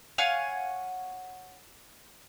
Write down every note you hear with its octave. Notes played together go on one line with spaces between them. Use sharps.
C#5 F5 F#5 G#5